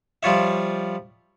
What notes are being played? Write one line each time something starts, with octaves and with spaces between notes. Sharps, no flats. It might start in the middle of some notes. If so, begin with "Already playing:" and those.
F3 G3 F4 C#5 E5